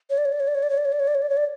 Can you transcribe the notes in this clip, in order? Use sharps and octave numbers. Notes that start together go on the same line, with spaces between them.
C#5
D5
C#5
D5
C#5
D5
C#5
D5
C#5
D5
C#5
D5
C#5
D5
C#5
D5
C#5
D5